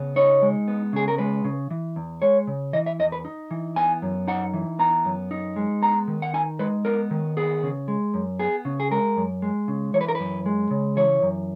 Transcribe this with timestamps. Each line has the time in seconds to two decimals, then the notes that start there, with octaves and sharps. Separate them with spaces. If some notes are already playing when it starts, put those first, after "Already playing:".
Already playing: C#3 B3
0.16 D#4 C#5
0.42 G#3
0.68 B3
0.93 C#3 G#4
1.08 A#4
1.18 G#3 B4
1.44 C#3
1.70 E3
1.96 E2
2.22 G#3 C#5
2.47 C#3
2.73 E3 D#5
2.86 E5
2.99 E2 D#5
3.12 B4
3.25 D#4
3.51 E3
3.76 B3 G#5
4.02 F#2
4.28 D#4 F#5
4.54 E3
4.79 B3 A#5
5.05 F#2
5.31 D#4
5.56 G#3
5.82 B3 A#5
6.08 D#3
6.22 F#5
6.34 D#4 G#5
6.59 G#3 B4
6.85 B3 A#4
7.11 D#3
7.37 B3 G#4
7.63 C#3
7.88 G#3
8.14 F#2
8.39 B3 G#4
8.65 C#3
8.80 G#4
8.91 G#3 A#4
9.17 F#2
9.42 G#3
9.68 C#3
9.94 E3 C#5
10.01 B4
10.08 A#4
10.15 F#2 B4
10.46 G#3
10.71 C#3
10.97 E3 C#5
11.22 F#2